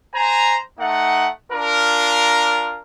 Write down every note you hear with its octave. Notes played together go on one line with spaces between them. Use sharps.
C5 G#5 A#5
A3 D#4 F#5
D4 F4 A#4